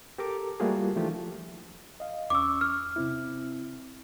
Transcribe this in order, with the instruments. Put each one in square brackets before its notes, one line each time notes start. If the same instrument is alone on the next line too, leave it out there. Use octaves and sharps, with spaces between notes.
[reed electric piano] G4 A4 A#4 A#5 D6
G3 A3 A#3 F4 F#4 G#4
E3 F3 A3 D4 F4 G4
D#5 F5
[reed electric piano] E2 C#4 C#6 [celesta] D6 E6
[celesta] F6
[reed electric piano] C3 C4 E4